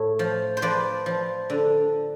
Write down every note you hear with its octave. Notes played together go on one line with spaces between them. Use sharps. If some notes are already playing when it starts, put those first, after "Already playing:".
Already playing: A2
F3
C5
F3 B4 D5
F3
D3